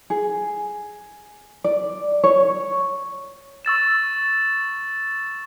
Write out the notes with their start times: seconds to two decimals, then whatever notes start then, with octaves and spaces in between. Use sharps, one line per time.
0.10 G#4
1.64 D5
2.24 C#5
3.65 C#6 E6 A6 E7